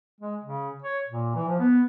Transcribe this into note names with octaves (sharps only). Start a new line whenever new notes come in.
G#3
C#3
C#5
A#2
E3
F3
B3